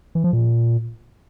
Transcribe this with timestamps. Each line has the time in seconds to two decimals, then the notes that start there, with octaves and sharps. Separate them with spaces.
0.15 E3
0.24 F3
0.33 A#2